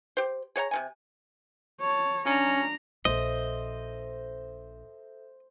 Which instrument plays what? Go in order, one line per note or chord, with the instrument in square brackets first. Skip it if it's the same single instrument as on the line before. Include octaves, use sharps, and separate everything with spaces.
[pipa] G4 C5
G#4 C#5 G5 A#5
C3 C#4 G#5
[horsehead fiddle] C#5 A5
[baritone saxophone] C#4 [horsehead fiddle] D4 A#5
[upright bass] A#1 [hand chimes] A4 E5 [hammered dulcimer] C5 [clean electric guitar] D#5